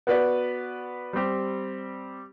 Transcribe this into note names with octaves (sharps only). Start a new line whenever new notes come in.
B3 F#4 B4 D5
G3 C4 G4